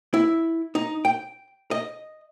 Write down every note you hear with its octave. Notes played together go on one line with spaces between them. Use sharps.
E4
D#4
G5
D#5